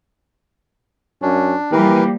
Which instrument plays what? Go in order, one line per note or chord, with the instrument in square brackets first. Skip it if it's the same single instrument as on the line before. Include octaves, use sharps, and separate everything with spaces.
[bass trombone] F#2 [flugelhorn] C#4 [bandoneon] D4
[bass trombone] E3 [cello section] F3 G3 A#3 [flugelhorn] G4 [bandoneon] A#4 B4